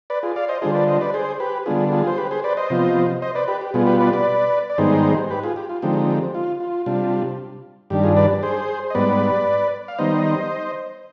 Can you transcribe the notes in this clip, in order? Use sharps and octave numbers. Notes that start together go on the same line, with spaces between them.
B4 D5
F4 G#4
D5 F5
C5 D#5
D3 G3 D4 F4 G#4 C5
B4 D5
C5 D#5
B4 D5
G#4 C5
G4 B4
D3 G3 B3 D4 F4 G#4
F4 G#4
C5
G4 B4
G#4 C5
B4 D5
C5 D#5
C3 F3 B3 F4
C5 D#5
B4 D5
G4 B4
G4
B2 G3 B3 F4 G#4
G4 B4
B4 D5
B4 D5
D5
G#2 D#3 G3 B3 D#4 G#4 C5
G4 B4
F4 G#4
G4
F4
D3 F3 G#3 C4 D#4 G4
F4
F4
C3 G3 D4 F4
G2 D#3 G3 D4 G4
F4 G#4
B4 D5
G#4 C5
D#5
G#2 G3 B3 B4 D5
F5
D#3 G3 B3 D#4 C5 D#5